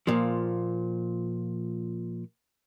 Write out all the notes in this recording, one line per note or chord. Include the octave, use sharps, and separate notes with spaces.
A#2 F3